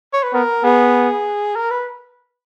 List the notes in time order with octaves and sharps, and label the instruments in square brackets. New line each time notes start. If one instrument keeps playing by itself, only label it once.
[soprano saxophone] C#5
B4
[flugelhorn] B3 [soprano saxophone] A#4
[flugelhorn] B3 [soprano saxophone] G#4
[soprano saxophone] A#4
B4